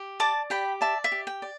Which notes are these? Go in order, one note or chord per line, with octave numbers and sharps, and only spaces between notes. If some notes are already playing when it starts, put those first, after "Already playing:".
Already playing: G4
D5 A5 D6
G4 G5 B5
D5 E5 A5
E5
G4
G5
D5